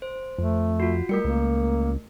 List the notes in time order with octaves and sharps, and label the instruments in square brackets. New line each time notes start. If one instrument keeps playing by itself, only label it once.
[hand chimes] C5
[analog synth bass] F2 [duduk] A3
[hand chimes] F4 F#4
[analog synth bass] G3 [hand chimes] A3 A#4 C#7
[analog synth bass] C#2 [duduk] A#3